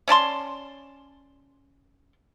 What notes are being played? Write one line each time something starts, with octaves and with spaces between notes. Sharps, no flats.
C#4 D5 A5 C6